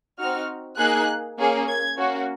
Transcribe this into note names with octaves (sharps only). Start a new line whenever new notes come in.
C4 D#4 F#4 F6
A#3 D#4 G#4 F#6
A#3 C#4 G#4
G#6
A#3 C#4 F#4